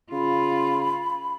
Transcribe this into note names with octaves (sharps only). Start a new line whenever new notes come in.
C#3 F4 B5